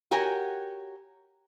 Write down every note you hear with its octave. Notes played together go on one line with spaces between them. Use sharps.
F#4 G4 A#4 C#5 F#5 G#5